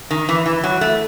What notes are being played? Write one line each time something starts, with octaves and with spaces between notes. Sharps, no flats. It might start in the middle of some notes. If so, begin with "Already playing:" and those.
D#3
E3
E3
F#3
A3